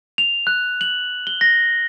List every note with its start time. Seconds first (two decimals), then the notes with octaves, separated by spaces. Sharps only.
0.18 F7
0.47 F#6
0.81 F#7
1.27 G7
1.41 A#6